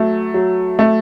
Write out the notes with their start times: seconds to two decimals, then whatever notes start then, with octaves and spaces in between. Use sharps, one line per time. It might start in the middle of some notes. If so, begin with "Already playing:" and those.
Already playing: F#3 A3
0.34 F#3
0.79 A3